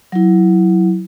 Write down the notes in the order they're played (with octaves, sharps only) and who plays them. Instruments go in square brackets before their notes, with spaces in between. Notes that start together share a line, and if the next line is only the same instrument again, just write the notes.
[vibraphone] F#3 E4